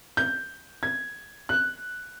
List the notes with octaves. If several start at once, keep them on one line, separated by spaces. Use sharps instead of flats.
G6
G#6
F#6